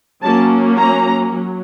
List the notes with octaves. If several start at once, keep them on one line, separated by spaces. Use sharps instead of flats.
F#3 A#3 C#4 A5
A#5
F#3